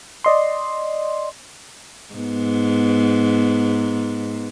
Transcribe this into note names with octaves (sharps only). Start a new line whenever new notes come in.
D5 D#5 C6
G#2 B3